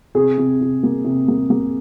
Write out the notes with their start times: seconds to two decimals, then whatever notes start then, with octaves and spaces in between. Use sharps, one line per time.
0.15 C3 G#4
0.38 C3
0.61 C3
0.83 A#3
1.05 C3
1.28 A#3
1.50 A#3